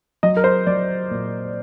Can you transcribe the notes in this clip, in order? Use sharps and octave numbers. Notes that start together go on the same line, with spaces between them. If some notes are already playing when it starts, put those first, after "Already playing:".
F#3 D#5
A#4
C5
F#3 D5
A#2